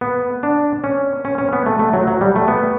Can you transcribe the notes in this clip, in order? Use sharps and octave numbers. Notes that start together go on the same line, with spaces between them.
B3
D4
C#4
C#4
C#4
B3
A3
A3
F#3
F#3
G3
A3
B3